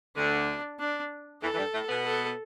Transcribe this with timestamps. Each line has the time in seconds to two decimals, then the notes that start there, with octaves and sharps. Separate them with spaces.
0.16 D2 D3 D4
0.79 D4
1.42 E2 E3 A4
1.54 E3
1.58 G2 G3
1.73 A2 A3
1.89 B2 B3
2.05 A4